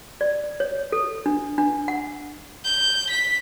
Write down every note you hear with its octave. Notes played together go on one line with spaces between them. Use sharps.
D5
C#5
A4
D4
D4
F#5
G6
B6